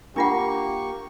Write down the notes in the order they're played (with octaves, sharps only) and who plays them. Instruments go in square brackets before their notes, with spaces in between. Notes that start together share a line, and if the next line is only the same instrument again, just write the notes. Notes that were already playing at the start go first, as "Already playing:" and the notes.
[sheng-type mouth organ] A#3 C#6 [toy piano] D4 F4 F#5 [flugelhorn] G4